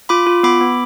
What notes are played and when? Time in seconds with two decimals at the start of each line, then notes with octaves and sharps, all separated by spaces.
0.09 F4 B5 D6
0.27 F4
0.43 B3 B5 D6
0.61 B3